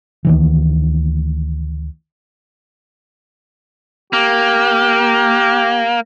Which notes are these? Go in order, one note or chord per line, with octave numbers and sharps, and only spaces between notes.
D2 D#3 E3
A#3 G4